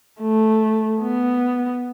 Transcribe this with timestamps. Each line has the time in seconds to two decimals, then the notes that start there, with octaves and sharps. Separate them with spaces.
0.21 A3
1.02 B3